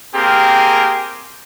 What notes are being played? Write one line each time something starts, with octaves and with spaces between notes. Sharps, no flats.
A#3 C4 G4 G#4 A#4